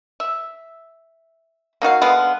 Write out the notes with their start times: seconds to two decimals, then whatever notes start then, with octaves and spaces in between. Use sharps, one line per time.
0.20 E5
1.82 A#3 D#4 F#4 F5
2.02 D3 G#3 B3 F5